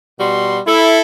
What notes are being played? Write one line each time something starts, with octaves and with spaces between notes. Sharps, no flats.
B2 G3 F#4 C6
E4 A4